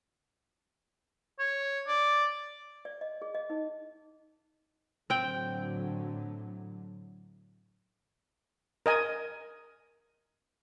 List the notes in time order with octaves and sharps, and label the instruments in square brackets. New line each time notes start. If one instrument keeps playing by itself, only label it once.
[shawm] C#5
D5
[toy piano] D5
D#5
G#4
D#5
D#4
[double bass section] A2 D3 F#3 [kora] C4 G5
[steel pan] A#4 D#5 G#5